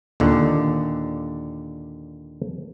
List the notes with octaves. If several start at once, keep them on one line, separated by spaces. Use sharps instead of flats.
D#2 A#2 D3